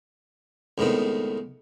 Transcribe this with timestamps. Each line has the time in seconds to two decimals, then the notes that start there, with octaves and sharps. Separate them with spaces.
0.78 C#2 A2 D#3 B3 C4